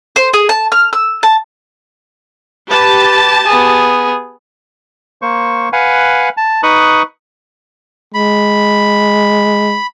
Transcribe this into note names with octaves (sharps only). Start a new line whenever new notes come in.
C5
G#4
A5
F6
E6
A5
G4 B4 A5
B3 G#4
A#3 C5 C#6
B4 F5 F#5 G#5
A5
D#4 B4 C#6 D#6 F#6
G#3 B5